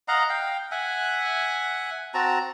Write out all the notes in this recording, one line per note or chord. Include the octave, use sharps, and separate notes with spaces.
D#5 F5 F#5 A#5
F5 G5
E5 F#5 G#5
C4 F#4 A5 A#5